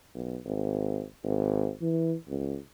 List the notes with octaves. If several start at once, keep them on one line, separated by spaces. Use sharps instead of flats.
B1
G#1
G#1
E3
C#2